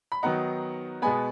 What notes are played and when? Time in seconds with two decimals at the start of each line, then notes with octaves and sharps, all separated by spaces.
0.12 B5
0.23 D#3 F#3 B3 D#4 F#5 A#5
1.02 B2 G#3 B3 G#5 B5